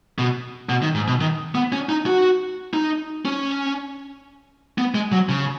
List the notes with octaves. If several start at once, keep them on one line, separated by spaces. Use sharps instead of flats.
B2
B2
D#3
G#2
B2
D#3
B3
C#4
D#4
F#4
D#4
C#4
B3
G#3
F#3
C#3